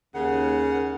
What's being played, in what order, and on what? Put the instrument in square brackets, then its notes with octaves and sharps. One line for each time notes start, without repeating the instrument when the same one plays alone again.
[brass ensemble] D#2 [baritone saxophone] C#3 [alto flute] A#4 [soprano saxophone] F#5